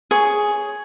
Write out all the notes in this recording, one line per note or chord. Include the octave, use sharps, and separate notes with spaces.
G#4 C#5